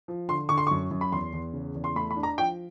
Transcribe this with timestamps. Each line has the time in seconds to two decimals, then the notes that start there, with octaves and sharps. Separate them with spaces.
0.08 F3
0.28 D3 C6
0.49 D3 C#6
0.58 C6
0.67 F#2 C#6
0.91 F#2
1.01 B5
1.12 E2 C6
1.33 E2
1.54 C#3
1.75 E2
1.84 C6
1.96 A3 B5
2.11 B5
2.16 D4
2.23 A#5
2.38 F3 G5